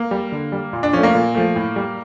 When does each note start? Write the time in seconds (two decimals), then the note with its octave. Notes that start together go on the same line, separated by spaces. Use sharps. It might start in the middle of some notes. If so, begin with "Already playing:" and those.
Already playing: A#3
0.11 G3
0.32 D3
0.52 G3
0.73 A#2
0.83 D4
0.93 F3 A3 C#4
1.03 A#3
1.15 A#2
1.35 F3 A3
1.56 A2
1.76 G3